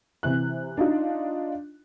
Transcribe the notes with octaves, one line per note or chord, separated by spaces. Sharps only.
C3 E3 F#6
D4 D#4 F4